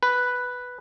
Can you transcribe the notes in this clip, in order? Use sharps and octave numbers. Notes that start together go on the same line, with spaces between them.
B4